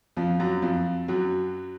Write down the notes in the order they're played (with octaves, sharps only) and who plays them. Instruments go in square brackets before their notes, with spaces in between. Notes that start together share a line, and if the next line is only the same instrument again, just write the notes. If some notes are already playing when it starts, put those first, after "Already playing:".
[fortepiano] F2 F3
F#2 F#3
F2 F3
F#2 F#3